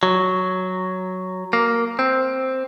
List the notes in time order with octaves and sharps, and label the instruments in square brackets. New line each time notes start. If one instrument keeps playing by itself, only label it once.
[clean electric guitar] F#3
A#3
C4